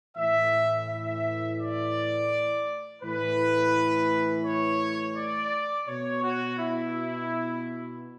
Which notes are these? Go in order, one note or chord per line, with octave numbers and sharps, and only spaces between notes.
A2 E3 E5
E5
D5
A2 E3 B4
C#5
D5
B2 C#5
F#4
E4